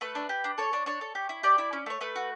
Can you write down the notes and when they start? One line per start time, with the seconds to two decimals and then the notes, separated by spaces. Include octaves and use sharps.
0.01 A3 B4
0.15 D4
0.29 G4
0.44 D4
0.58 A4 C#5
0.73 D4
0.86 D4 C#5
1.01 A4
1.15 G4
1.29 E4
1.43 G4 D5
1.58 E4
1.73 C#4
1.86 A3 C#5
2.01 A3 B4
2.16 F#4